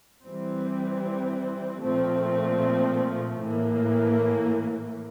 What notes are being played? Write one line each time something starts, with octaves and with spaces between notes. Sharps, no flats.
E3 G3 C4
A#2 F3 A3 C4
A2 E3 A#3